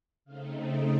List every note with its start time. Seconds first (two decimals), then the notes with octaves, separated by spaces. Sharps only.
0.25 C#3 A3 C4 D#4 F5